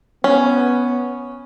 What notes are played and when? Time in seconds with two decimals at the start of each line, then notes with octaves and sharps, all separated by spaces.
0.24 B3 C#4